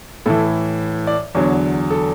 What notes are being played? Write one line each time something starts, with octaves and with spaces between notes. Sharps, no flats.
A2 E3 A4
D5
E2 D3 F#3 C#5
A4